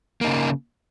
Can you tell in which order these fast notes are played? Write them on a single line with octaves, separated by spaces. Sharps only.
A#3 D#4 C#3